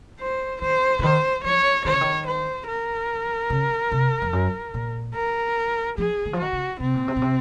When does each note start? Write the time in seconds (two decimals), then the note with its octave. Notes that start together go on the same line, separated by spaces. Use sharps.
0.20 C5
0.61 D#3 C5
0.99 C#3
1.03 D#3 C5
1.44 F3 C#5
1.85 D#3 C#5
1.93 C#3
2.01 D#3
2.26 C5
2.68 A#4
3.50 C#3
3.92 C3
4.22 F2
4.33 F#2
4.74 A#2
5.15 A#4
5.98 F3 G#4
6.25 D#3
6.33 F3
6.39 D#3 F#4
6.53 C#3
6.80 C3 C4
6.94 A#2
7.08 C3
7.16 A#2
7.22 C3